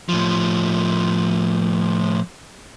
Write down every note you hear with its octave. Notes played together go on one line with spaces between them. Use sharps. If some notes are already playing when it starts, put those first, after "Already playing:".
A2 F3